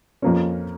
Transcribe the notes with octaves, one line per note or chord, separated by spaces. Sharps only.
F2 F3 A#3 C#4